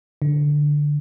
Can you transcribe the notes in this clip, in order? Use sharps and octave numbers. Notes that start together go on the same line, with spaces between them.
D3